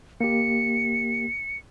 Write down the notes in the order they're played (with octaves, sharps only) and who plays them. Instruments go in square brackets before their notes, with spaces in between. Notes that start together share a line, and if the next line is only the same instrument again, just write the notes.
[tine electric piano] A#3 G4 [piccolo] C#7